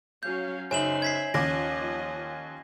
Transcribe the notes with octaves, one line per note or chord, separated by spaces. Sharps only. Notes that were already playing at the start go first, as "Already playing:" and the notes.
F#3 C#4 F5 G6
F#1 D#4 C#5 E5 G#5 C6 E7 F#7
E5 G#6 B6 C7
D#2 F3 C#4 D#5 D6 A#6